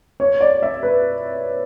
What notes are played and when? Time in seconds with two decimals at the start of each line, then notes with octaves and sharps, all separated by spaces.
0.20 C#5
0.41 D5
0.63 E5
0.83 B4